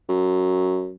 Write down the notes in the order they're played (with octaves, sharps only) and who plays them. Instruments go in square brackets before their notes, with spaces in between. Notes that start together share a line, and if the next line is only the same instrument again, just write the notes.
[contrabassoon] F#2